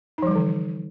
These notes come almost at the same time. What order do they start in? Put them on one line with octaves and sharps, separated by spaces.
D#4 F3 G3 E3 D3